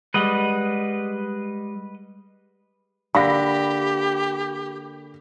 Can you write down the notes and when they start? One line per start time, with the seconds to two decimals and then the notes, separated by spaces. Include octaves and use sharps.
0.14 G3 G#3 B4 D#5 F#5
3.15 D3 A#3 G4 B5 A#6